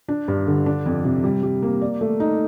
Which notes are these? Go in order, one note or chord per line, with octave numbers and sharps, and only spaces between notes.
D4
G2
D3
D4
F2
C3
G3
G3
A#3
D5
A3
D#4